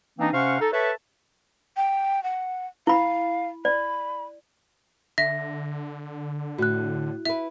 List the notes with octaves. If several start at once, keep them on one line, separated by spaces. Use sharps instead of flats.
E3 A#3 C4 D4 D#4
C3 C#4 C5 F5 F#5 C#6
D#4 A4
A4 B4 C#5 E5 A5 C#6
G5
F#5
E4 F5 B5
D5 B5
D3 E5 A#6
A2 F#4 F#6
E4 B4 E5